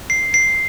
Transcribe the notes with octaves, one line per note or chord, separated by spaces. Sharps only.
C7
C7